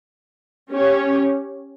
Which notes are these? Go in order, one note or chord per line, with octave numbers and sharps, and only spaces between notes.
C#4 G4 C#5